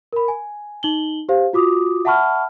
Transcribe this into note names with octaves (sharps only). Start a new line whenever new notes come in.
A#4 B5
G#5
D#4 F#7 G7
G4 C5 F5
F4 F#4 D6 D#6
E5 F#5 A5 B5 C#6 F6